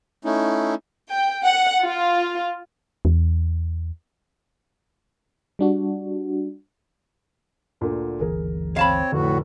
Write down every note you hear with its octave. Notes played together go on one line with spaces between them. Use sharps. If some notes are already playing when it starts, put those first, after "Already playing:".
A3 C#4 D#4 E4
G5
F#5
F4
E2
G3 D4 F#4
D2 A#2 D3
G1 D2 E3 G#4 A#4
C4 C#5 F5 A5 B5
F1 A2 D3 F#4